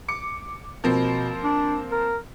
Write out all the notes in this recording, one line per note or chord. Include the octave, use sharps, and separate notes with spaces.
D6 C#7
B2 F3 A#3 C4
D4
A#4